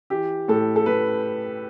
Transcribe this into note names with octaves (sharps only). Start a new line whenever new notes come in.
E3 G4
A2 A4
A4
A2 B4